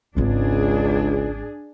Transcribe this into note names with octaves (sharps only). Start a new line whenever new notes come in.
G#1 C#2 C#4 D4 G#4